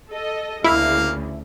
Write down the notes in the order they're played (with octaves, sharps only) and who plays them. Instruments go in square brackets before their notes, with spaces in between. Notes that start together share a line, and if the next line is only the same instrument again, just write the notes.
[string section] A4 D#5
[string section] D2 C#3 [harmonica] A#3 F5 [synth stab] E4